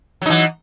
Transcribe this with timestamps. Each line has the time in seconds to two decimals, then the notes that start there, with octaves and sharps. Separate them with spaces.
0.22 F#3
0.26 D#4
0.30 E3